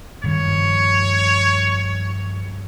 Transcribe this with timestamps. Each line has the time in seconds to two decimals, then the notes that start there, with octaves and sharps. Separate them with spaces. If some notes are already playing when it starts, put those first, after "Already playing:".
0.24 G2 D#3 F3 C#5